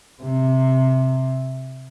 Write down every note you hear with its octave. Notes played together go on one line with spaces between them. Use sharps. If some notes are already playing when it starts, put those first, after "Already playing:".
C3